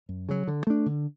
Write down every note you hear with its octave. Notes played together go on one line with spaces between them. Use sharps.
F#2
C#3 F#3
D3
A3 D4
D3